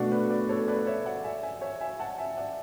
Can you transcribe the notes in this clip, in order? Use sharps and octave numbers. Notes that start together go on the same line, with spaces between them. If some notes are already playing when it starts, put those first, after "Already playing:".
Already playing: B2 A3 D4 F#4 D5 F#5
B4 D5
B4 D5
A4 C#5
B4 D5
C#5 E5
D5 F#5
E5 G#5
E5 G#5
C#5 E5
E5 G#5
F#5 A5
E5 G#5
D5 F#5